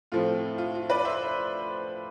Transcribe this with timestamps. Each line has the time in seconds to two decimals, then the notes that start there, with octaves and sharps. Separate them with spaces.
0.12 A2 F3 A3 C4 F4
0.58 F4
0.75 F4
0.90 B4 D5
1.05 C5 E5